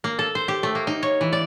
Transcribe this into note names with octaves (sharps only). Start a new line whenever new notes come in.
A#3
A4
C5
G4
A3
A#3
D#4
C#5
E3
D5